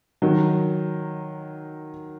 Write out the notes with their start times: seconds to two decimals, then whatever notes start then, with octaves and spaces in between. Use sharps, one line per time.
0.22 D#3 F#3